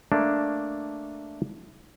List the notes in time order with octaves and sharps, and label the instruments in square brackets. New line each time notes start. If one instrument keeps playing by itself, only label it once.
[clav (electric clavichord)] A3 A#3 D4